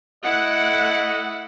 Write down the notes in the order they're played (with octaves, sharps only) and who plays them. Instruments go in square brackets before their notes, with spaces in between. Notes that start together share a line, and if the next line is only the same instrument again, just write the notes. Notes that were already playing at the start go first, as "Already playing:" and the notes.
[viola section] A3 F#5 [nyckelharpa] E4 [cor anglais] D#5